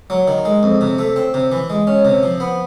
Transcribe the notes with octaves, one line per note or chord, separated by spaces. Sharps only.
F#3
D#3
G#3
F2
C3
A3
C4
C3
E3
G#3
C#4
C3
F3
B3